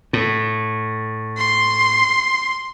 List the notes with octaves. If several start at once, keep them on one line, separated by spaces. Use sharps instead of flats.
A2
C6